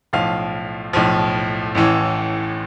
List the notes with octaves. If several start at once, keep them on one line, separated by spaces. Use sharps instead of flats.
B1 A2 F3 F5
B1 A2 F3
A1 A2 E3